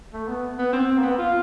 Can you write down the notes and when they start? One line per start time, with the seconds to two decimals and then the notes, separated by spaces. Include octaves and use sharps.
0.13 A3
0.28 B3
0.58 B3
0.73 C4
0.98 A#3
1.03 B3
1.18 F4